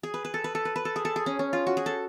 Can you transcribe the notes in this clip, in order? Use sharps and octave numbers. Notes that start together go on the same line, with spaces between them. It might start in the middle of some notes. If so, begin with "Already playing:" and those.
G#4
B4
B4
A4
B4
A4
B4
B4
A4
G#4
A4
G#4
C#4
C#4
F4
F#4
G#4
A4